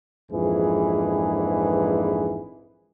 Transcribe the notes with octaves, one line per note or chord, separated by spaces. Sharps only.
A#1 F2 G#2 E3 G#4 B4